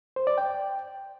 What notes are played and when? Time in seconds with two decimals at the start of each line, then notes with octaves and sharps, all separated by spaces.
0.16 C5
0.27 D5
0.38 G5